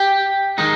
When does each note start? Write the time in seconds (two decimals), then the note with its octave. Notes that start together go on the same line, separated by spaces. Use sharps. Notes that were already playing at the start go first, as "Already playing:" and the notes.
Already playing: G4 G5
0.58 D#3 G#3 D#4